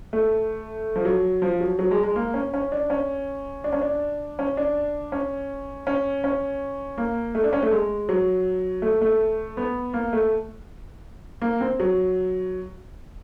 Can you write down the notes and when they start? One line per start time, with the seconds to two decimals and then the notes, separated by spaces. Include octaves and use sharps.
0.13 A3
0.96 F3
1.05 F#3
1.42 F3
1.60 F#3
1.79 F#3
1.91 G#3
2.03 G#3
2.16 A#3
2.34 C#4
2.54 C#4
2.72 D4
2.90 C#4
3.64 D4
3.73 C#4
3.81 D4
4.39 C#4
4.57 D4
5.12 C#4
5.87 C#4
6.24 C#4
6.98 A#3
7.35 A3
7.44 D4
7.53 C#4
7.63 A3
7.71 G#3
8.09 F#3
8.82 A3
9.01 A3
9.57 B3
9.94 A#3
10.13 A3
11.42 A#3
11.61 C4
11.80 F#3